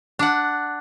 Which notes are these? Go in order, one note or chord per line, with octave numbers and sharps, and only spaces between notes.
D4 F#5